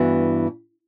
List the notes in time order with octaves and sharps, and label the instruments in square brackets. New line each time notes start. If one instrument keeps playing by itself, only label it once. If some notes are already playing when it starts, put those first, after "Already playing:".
Already playing: [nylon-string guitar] G2 E3 B3 F#4